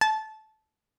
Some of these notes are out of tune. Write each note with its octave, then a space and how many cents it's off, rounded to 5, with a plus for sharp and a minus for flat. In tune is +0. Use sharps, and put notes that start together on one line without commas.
A5 -20